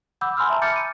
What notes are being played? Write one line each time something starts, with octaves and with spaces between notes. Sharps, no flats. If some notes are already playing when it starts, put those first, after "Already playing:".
F#5 B5 D6 E6 G6
G#5 B5 C6 E6 F6
E5 A5 A#5
D6 F6 G6 A6 C#7
D#7